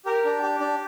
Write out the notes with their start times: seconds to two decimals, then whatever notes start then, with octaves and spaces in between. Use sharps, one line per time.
0.05 G4 A#4
0.25 D4
0.42 G4
0.60 D4